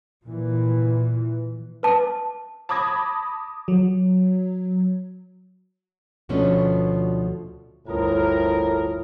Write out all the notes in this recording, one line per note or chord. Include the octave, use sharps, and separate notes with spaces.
A#2 E3
B4 A5
A5 B5 D6 D#6 G#6 A#6
F#3
D2 B2 F3 A3 C#4 D4
G1 D2 A2 F4 A#4 D#6